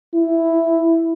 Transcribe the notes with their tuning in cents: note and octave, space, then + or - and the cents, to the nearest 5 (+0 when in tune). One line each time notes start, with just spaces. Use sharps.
E4 +0